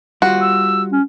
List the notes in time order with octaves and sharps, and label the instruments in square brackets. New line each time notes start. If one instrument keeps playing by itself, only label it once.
[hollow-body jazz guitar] G3 F4 [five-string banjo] F#4
[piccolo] E6
[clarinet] C#4